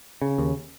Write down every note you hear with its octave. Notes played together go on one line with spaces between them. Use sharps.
C#3
D#2